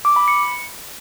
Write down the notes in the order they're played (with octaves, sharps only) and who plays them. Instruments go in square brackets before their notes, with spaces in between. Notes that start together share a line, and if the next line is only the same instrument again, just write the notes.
[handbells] D6
B5
C#7